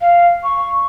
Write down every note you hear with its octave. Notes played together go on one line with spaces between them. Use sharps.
F5
C#6